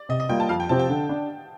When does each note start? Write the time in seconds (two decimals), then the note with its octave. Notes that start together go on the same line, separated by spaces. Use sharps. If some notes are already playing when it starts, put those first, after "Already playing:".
Already playing: D5
0.09 C3 D#5
0.20 D#5
0.29 G3 A#3 F4 G5
0.40 A5
0.49 F2 F5
0.60 G5
0.69 C3 F3 C4 G4 A5
0.79 G5
0.89 D3
1.09 D4